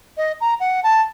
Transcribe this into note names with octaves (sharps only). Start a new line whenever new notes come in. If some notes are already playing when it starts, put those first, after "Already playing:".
D#5
A#5
F#5
A5